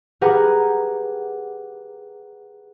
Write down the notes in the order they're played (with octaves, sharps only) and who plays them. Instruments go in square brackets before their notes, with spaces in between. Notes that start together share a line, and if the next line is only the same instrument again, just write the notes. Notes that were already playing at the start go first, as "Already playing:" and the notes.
[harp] G4 G#4 A#4 B4 F#5 G#5